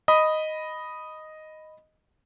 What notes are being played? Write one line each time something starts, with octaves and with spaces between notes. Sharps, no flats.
D#5 B5 D#6